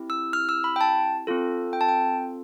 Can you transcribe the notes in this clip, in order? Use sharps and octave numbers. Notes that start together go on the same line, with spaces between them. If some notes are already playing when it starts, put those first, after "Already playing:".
Already playing: C4 E4 G4
E6
F6
E6
B5
G5
A5
C4 F4 A4
G5
A5
G5